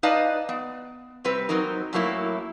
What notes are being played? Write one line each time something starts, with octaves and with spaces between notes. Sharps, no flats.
D#4 B4 D5 D#5 F5 A5
B3
C3 G3 C4 B4
F#3 C4 D#4 A#4
F#2 A2 F#3 A#3 E4